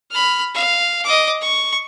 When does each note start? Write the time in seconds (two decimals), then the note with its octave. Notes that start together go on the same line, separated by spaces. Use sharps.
0.11 B5 F6
0.54 F5
1.04 D#5 D6
1.41 C#6